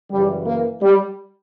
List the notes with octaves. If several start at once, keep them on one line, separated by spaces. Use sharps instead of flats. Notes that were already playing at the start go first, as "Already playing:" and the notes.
F#2 C#3 E3 G3
A#3
G3